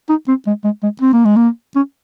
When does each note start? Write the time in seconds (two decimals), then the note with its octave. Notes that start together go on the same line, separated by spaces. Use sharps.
0.09 D#4
0.28 C4
0.47 G#3
0.64 G#3
0.83 G#3
1.01 C4
1.13 A#3
1.25 G#3
1.36 A#3
1.76 C#4